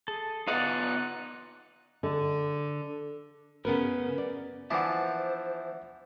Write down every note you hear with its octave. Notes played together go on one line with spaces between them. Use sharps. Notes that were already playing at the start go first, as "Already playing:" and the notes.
G#4 A4
B3 D#4 F4 D5 D#5 F#5 F#6
D3
C#3 B3 C#4 A#4 B4
D5
E3 F3 D4 C5 E5 F#5